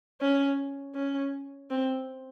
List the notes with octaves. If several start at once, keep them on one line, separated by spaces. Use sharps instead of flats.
C#4
C#4
C4